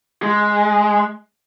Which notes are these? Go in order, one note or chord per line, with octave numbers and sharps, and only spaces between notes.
G#3